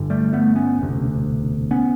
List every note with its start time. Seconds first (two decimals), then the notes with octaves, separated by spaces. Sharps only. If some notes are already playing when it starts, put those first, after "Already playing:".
Already playing: G1 G2 D3
0.10 G3 A3
0.33 A3 B3
0.55 B3 C#4
0.79 E1 D2 C3
1.71 B3 C#4